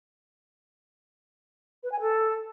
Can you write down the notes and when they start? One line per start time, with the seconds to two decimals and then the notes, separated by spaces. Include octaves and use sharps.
1.83 B4
1.91 G#5
1.99 A4